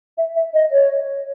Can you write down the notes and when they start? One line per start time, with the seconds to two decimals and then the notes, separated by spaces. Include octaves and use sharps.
0.18 E5
0.36 E5
0.54 D#5
0.72 C#5